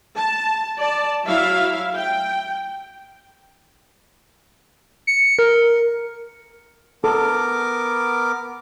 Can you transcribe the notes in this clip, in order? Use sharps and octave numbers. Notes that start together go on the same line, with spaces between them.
A5
D5 A5
F#3 E4 F#4 E5 F5
G5
C#7
A#4
B3 A4 A#4 D6